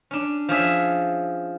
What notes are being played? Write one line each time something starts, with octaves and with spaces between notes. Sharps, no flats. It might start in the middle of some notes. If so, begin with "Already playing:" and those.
C#4 D4
F3 C#4 G#4 E5